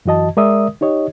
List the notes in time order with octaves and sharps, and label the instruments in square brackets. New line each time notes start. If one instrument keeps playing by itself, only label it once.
[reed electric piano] F#2 E3 F#4 D#5 A5
G#3 A#4 D5 E5 D#6
D#4 G4 C#5 D#5